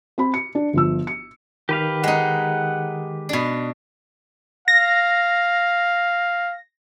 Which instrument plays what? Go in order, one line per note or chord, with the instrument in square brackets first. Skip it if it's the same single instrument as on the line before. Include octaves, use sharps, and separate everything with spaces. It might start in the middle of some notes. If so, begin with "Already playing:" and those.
[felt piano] C4 B5
C#7
D4
G1 F3 E6
C#7
[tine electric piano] D#3 [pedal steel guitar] G4 B4 F5
[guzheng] G#3 D#4 [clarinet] F#5
[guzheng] B2 D4
[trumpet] F5 [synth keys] A#6